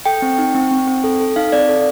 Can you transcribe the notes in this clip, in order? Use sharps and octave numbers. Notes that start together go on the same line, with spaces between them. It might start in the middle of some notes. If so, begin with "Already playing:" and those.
A4 G5
C4
D#4
C4
C4
C4
A4
A4
D#4 F5
C4 D5
A4